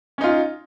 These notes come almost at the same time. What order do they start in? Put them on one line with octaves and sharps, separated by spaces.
C#4 D#4 F4